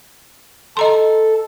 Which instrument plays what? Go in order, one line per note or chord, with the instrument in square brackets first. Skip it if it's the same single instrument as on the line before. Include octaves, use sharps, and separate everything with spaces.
[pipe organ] A4 [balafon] D#5 A#5 C6